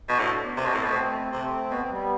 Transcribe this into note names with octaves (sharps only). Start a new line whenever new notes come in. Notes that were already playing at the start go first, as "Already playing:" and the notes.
B2
A2 D4 F#4
D4 F#4
B3 D4
C3 D4
B2 C4
A2 B3
B2 A3 C4
C3 A3 C4
B2 B3
C4
G3 B3